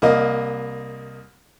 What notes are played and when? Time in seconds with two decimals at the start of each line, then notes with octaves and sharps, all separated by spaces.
0.02 C2 A#3 D#5